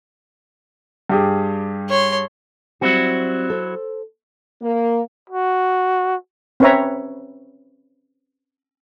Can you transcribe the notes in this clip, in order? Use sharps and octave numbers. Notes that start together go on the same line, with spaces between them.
G2 G4 G#4
C#5 C6
F#3 G3 C4 E4 F#4 G4
A4 C5
A#3
F#4
C4 C#4 B4 C#5 E5 A#5